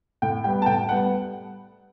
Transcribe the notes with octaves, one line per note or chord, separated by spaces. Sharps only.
A2 G5
G3 B3 G5
A5
A2 G5
G3 B3 F#5